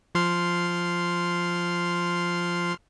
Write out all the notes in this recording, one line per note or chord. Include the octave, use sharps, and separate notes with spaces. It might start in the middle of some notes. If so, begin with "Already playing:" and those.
F3 C6 F6